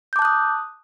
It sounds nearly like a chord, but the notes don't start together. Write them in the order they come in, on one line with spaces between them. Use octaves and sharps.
G6 D6 A5 F#6 D#6